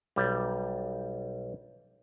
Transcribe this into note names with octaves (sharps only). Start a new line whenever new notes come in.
B1 G3